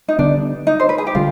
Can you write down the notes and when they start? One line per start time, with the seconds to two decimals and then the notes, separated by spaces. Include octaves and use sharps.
0.08 D#4
0.18 D3 G3 B3 D4
0.67 D#4
0.80 C5
0.89 B4
0.98 G#4
1.07 G4
1.15 D3 G3 F4